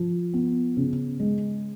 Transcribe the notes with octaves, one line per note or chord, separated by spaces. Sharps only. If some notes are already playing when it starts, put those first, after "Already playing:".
Already playing: F3
B3
C#3
G#3